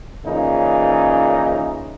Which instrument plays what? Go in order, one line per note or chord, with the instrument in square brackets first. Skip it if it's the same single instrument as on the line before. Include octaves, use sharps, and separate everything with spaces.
[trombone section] A#2 C#3 E3 D#4